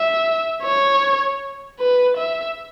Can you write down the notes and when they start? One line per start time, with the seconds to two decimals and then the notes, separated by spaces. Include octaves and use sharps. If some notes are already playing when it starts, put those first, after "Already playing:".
Already playing: E5
0.63 C#5
1.80 B4
2.18 E5